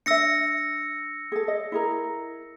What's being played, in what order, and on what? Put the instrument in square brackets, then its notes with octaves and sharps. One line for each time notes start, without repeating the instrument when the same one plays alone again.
[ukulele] D4 E5 [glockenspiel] E6 A#6 C#7
[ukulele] G#4 A4
D#5
E4 G#4 A#4